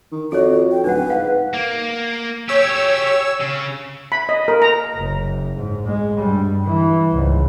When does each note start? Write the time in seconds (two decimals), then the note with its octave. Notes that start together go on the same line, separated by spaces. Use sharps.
0.12 D#3
0.32 F2 F#4 A4 C#5
0.71 G5
0.84 D1 D#4 B4 F#5
1.10 G#2 F5 F#5
1.53 A#3
2.49 G4 G#4 C#5 E6
3.41 C#3
4.12 B5
4.29 D#5
4.48 A#4
4.62 A#5
4.96 F#1
5.57 G#2
5.86 G#3
6.19 G2 G3
6.65 E3
7.13 C#2 G#2